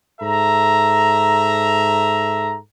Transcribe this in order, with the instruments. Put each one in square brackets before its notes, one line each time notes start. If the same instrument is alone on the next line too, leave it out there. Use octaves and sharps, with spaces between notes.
[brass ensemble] G#2 A4 E5 A#5